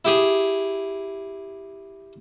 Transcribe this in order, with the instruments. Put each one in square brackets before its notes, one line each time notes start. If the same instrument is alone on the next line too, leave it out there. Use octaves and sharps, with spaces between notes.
[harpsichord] E4 G4 G#4